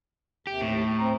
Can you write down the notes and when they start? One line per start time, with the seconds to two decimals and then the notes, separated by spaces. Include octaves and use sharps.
0.47 D#2 C3 G4
0.61 A2
0.82 E2
0.99 C4 A#5